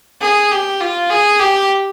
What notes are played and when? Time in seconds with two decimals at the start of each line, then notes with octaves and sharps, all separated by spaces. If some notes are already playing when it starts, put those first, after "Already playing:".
0.21 G#4
0.51 G4
0.80 F4
1.10 G#4
1.39 G4